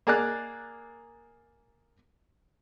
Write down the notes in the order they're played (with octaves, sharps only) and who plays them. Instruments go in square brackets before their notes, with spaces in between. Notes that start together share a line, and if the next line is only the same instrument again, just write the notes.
[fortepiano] A#3 G#4 D5 A#5 F#6